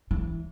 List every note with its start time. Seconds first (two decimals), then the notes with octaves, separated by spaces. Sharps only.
0.11 E3